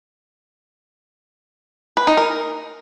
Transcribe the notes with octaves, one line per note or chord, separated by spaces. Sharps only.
B4
D#4
A#4